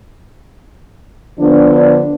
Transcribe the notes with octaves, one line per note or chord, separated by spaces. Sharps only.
D3 F3 B3 D4